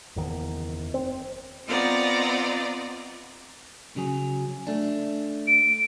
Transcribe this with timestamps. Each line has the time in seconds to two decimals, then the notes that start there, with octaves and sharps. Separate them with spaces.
0.16 F#1 E2 D#3
0.94 C4
1.68 B3 C4 F4 D5 D#5 A#5
3.96 C#3 F#3 G#4
4.67 A3 D4
5.47 D7